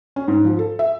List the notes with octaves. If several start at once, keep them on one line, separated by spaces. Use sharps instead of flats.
C#4
G#2
F3
A4
E5